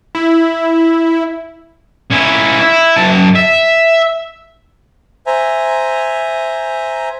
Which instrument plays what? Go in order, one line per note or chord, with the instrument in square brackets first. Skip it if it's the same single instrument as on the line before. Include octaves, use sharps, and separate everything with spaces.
[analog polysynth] E4
[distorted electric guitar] C#4 E4
E4
F#2 A5
E5
[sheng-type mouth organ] C5 E5 G#5 A#5